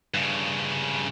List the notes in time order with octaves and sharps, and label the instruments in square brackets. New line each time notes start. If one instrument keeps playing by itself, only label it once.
[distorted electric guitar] G2 C#3